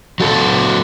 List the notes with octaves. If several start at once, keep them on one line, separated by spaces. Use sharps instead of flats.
F#3 F#4 A4